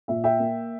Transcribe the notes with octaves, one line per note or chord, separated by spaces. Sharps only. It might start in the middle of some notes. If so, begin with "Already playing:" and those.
A#2 E5
E5 G5
A#3